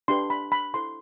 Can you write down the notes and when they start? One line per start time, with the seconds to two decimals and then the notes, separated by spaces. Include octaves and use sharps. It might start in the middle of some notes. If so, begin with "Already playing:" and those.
0.08 D4 G4 B4 C6
0.30 B5
0.52 B5
0.74 E4 A4 C5 C6